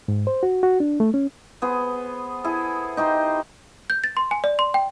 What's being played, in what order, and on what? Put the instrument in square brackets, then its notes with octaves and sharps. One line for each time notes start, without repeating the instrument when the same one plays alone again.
[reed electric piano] G#2
C5
F#4
F#4
D4
A3
C#4
[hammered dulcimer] B3 G#4 C5
E4 G#4 A4
D#4 G4 C5
[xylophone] G6
A6
C6
G#5
D5
C6
G5